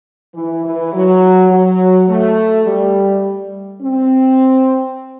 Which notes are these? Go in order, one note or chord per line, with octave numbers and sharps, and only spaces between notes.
E3
E3
F#3
F#3
A3
G3
C4